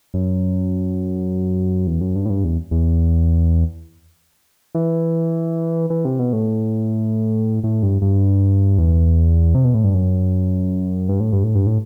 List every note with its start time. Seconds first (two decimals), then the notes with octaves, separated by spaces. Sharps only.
0.14 F#2
1.87 E2
2.01 F#2
2.16 G2
2.26 A2
2.30 G2
2.44 E2
2.71 E2
4.75 E3
5.90 E3
6.05 C3
6.19 B2
6.33 A2
7.64 A2
7.83 G2
8.02 G2
8.78 E2
9.55 C3
9.64 B2
9.74 A2
9.84 G2
9.94 F#2
11.09 G2
11.20 A2
11.32 G2
11.44 A2
11.55 G2
11.67 A2